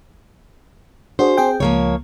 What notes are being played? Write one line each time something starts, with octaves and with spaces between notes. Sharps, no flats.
D4 F#4 G#4 C5
C4 G#4 G5
C#2 F3 A#3 C#5